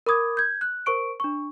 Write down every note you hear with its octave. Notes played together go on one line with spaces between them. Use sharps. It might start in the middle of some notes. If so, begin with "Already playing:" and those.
A#4 B5 D6 D#6 G#6
G6 G#6
F#6
A#4 C5 C#6 D7
D4 C#6